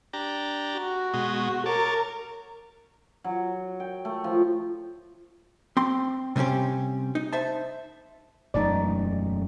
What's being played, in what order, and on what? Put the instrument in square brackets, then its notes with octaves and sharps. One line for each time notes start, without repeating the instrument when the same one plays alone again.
[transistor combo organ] D4 G4 A#5
[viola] F#4
[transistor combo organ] B2 G#3 D#5
[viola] A#4 [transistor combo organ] C#5 A5 D6
[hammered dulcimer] F#3
G5
A3
F3
[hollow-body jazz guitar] C4 C6
C3 G3 C4 C#4 G4
D#4
C5 E5 A5
[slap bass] E1 F#2 A3 [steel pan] D#4 D5